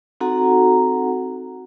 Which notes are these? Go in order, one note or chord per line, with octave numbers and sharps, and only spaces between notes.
C4 D#4 F#4 A4 F#5 A#5